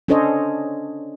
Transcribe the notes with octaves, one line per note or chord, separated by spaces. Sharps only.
C#4 D4 A4 C5 C#5 D#5